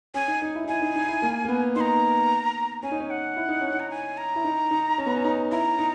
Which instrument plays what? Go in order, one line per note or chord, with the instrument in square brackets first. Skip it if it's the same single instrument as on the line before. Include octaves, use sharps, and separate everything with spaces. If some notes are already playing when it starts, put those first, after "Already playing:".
[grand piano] C#4 [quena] G#5
[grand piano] D#4
D#4
E4
D#4
[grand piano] E4 [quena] G#5
[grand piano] D#4
D#4
E4
A#3
A#3
B3
[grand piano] D#4 [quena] A#5 C6
[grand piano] C#4 [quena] G#5
[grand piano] D#4
C#4
[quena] F#5
[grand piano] E4
D#4
C#4
D#4
[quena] A#5
G#5
A#5
[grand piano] E4
D#4
D#4
C#4
B3
C#4
D#4
[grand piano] E4 [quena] A#5
[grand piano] D#4